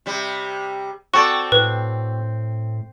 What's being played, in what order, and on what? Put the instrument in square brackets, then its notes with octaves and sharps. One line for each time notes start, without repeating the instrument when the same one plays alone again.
[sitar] C3 G3
[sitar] C4 [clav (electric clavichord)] F#4 A4 D5 [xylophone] C#6
[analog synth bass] A2 [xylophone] B4